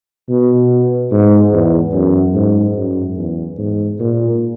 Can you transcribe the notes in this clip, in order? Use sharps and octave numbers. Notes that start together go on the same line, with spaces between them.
B2
G#2
E2
F#2
G#2
F#2
E2
G#2
A#2